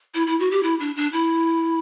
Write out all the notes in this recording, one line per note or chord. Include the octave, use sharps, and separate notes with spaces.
E4
E4
F#4
G4
E4
D4
D4
E4